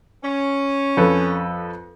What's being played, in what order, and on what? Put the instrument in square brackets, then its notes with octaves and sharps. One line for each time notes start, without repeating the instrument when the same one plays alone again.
[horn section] C#4
[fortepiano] F2 A4 B4